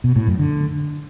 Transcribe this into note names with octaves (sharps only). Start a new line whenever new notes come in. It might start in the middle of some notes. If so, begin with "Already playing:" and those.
B2
A2
F#2
D3